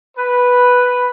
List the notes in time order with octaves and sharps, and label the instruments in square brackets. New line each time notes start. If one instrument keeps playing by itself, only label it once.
[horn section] B4